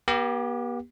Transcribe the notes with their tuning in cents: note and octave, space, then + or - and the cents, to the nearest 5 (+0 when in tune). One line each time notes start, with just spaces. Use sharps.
B3 -45 G4 +0